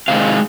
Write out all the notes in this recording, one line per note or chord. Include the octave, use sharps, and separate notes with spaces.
C3 D#3 G#3 F5